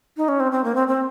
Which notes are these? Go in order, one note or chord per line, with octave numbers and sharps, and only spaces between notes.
D#4
C#4
C4
C4
A#3
C4
C4